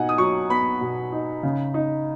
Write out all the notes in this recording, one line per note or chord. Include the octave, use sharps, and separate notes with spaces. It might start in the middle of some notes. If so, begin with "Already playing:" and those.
Already playing: B2 D#4 F#5 G#5
D#6
F#3 C#6
B3 B5
B2
D#4
C#3
D#4